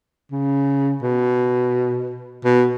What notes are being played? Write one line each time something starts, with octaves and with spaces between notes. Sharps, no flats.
C#3
B2
B2